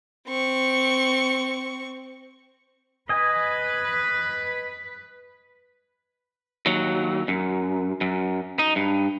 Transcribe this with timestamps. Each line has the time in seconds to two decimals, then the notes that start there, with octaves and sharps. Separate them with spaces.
0.28 C4 C#6
3.09 B4 D#5 G#5
6.66 D#2 F#3
7.28 F#2
8.01 F#2
8.59 D#4
8.76 G2